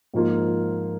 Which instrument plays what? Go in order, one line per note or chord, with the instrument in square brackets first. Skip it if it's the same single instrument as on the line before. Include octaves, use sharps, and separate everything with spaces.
[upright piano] G#2 F3 A#3 F4